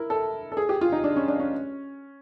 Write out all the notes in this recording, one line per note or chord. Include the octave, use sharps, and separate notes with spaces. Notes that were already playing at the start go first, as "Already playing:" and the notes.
Already playing: E4 A#4
A4
A4
G#4
G4
F4
D#4
D4
C#4
D4
C#4